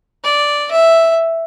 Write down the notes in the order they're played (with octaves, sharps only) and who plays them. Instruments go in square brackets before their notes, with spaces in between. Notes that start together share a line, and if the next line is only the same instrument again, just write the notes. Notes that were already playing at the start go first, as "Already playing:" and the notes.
[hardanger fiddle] D5
E5